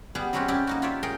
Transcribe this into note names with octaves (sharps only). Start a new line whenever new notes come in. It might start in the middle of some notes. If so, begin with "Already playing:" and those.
G3 B3 G#4
F#3 G#3 C4 C#4 F#4 G4
C4 C#4 E4 G4 D5
A#3 D#4 F#4
F4 G4 C#5 D5 E5
G#4 A#4 C#5 G5